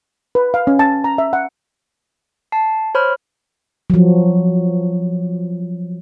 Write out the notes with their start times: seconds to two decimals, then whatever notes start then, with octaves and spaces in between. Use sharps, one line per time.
0.35 B4
0.54 F5
0.67 C#4
0.79 A5
1.04 A#5
1.18 E5
1.33 F#5
2.52 A5 C7
2.95 C5 C#5 B5 F6
3.90 F3 F#3